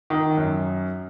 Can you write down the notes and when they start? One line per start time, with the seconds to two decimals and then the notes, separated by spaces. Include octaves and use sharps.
0.10 D#3
0.37 F#2